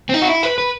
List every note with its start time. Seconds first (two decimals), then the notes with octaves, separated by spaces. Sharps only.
0.09 C4
0.14 D#4
0.22 F#4
0.28 E4
0.43 B4
0.58 B4